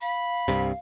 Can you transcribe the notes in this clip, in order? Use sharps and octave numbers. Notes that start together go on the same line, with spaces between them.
F5 B5
C2 G2 C3